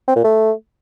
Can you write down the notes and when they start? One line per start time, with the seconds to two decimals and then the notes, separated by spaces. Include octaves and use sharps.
0.08 C4
0.16 A#2
0.24 A3